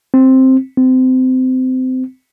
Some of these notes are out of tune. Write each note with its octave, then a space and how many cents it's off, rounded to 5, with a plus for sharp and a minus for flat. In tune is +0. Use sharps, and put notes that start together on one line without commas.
C4 +5
C4 -25